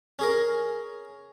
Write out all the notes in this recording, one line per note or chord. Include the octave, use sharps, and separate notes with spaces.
C#4 G#4 A#4